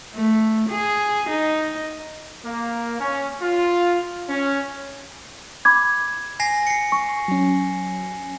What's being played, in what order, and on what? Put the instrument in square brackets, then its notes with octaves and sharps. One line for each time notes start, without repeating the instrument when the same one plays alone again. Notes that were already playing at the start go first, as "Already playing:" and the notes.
[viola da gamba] A3
G#4
D#4
[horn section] A#3
C#4
F4
C#4
[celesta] B5 D6 G#6
[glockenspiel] G#5 A#6 C7
C7 C#7
[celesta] C#6
[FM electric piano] F#3 C#4